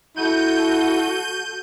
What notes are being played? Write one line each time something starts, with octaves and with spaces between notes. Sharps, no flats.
E4 F#4 A4 G6 D#7